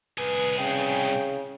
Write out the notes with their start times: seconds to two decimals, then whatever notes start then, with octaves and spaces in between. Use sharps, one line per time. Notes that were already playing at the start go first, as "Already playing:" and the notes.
0.18 C2 G#4 B4
0.58 C#3 G5